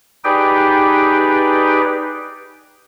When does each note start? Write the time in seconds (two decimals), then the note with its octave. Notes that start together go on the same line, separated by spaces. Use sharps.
0.24 D#4 G4 G#4 B4 D5 G5